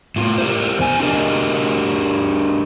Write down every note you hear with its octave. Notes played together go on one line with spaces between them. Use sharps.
A2 F4
G4 A#4 C5
E2 B2 G#5
D4 G4 G#4 A#4 D#5